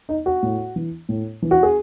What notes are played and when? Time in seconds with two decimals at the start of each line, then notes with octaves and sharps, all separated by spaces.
0.09 D#4
0.26 F#4
0.43 A2
0.76 E3
1.09 A2
1.42 E3
1.51 F#4
1.63 G#4